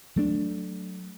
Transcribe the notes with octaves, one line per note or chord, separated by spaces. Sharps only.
F#3 A3 D4